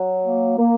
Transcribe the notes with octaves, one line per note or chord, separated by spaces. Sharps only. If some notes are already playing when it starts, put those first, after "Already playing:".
Already playing: F#3
A#3
A#3